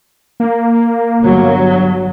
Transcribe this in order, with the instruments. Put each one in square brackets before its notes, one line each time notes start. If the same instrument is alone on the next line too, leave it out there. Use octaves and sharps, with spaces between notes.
[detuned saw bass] A#3
[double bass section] G1 F#3